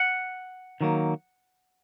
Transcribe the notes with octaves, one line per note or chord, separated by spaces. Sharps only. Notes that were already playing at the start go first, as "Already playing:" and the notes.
Already playing: F#5
D#3 F#3 A#3